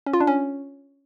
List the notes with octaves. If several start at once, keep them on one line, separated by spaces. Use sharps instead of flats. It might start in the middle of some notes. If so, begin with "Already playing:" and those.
C#4
F4
D4
C#4